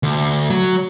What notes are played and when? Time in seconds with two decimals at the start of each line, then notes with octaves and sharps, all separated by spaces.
0.03 D2
0.50 F#3